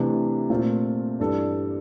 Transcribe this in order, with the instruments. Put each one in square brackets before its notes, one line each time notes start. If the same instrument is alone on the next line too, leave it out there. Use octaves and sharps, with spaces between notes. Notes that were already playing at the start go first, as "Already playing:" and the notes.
Already playing: [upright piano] C3 E3 A3 D4
A#2 A3 C4 F4
G2 E3 G3 D4 A4